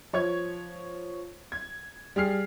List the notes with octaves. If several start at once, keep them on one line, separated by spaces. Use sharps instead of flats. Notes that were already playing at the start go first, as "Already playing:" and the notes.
F3 C#5 C#6 G#6
G#6
G3 G#4 F6 C7